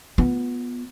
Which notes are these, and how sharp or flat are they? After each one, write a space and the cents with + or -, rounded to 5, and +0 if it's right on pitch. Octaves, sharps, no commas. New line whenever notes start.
B3 -10 F4 +25